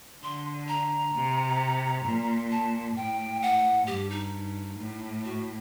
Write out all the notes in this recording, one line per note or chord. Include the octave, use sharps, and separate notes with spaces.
D3 C6
A#5
C3
A#2
A5
A2 G5
F#5
G2 G4
D#4
A2
F#4